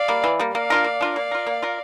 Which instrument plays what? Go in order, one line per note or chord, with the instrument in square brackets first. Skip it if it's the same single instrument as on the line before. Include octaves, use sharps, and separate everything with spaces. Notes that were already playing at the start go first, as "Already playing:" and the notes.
Already playing: [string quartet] D5 F5
[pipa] G3 A#3
E3
G3 A#3
[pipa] A#3 [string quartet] D5 F5
[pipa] D4 F4 A#4
A#3
D4 F4 A#4
[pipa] A#3 [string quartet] D5 F5
[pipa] F4 A#4
A#3
F4 A#4